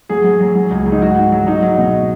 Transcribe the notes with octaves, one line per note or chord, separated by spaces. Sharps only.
F#3 G#4
F#3
F#3
F#3
C#2
F#3
D#4
G#2 F#4
G#2
F#3
F#3 D#4
F#3
B2